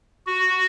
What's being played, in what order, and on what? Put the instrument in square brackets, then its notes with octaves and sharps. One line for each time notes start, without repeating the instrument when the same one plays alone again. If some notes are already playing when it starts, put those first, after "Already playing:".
[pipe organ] F#4